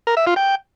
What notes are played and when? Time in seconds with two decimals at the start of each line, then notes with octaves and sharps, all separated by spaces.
0.07 A#4
0.17 E5
0.27 F4
0.36 G5